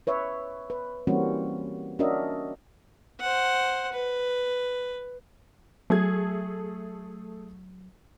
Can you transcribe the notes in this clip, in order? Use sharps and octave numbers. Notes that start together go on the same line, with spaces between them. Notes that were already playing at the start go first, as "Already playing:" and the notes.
B4 C#5 E5
B4
E3 G3 A#3 C4 C#4 F#4
C#4 D4 F#4 A#4 D#5 E5
C5 F#5
B4
F#3 A3 G#4 G#6